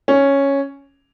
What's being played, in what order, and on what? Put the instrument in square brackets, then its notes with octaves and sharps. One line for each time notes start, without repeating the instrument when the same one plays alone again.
[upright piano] C#4